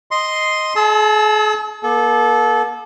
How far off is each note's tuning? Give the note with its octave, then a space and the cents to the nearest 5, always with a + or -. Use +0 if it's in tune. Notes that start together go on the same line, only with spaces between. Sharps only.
D#5 +0 C6 +0
G#4 +45 A5 +0 E6 -35
A#3 +40 A4 -25